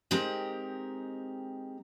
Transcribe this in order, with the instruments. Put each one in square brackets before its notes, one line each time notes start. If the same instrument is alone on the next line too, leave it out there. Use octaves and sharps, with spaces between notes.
[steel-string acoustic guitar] G#3 C4 D#4 G4 A#4